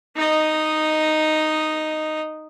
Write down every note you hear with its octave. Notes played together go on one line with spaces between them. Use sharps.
D#4 D#5